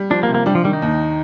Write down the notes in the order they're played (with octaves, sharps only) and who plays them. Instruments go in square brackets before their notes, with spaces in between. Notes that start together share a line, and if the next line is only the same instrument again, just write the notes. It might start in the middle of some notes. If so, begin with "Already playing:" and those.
Already playing: [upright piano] G3
[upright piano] F3 [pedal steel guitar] D4
[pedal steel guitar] A#3
[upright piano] C3
[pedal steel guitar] A#3
[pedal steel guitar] G3 [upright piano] D4
[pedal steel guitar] F3
[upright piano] D#3 [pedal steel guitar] G3
[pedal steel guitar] D#4
[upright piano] D#2